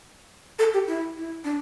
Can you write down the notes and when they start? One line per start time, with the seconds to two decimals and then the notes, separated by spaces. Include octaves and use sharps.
0.59 A4
0.74 G4
0.88 E4
1.17 E4
1.44 D4